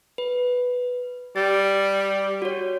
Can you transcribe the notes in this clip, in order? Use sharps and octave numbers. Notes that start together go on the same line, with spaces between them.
B4
G3 A6
F#4 C#5